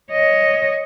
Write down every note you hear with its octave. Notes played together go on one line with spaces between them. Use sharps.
C#5 D#5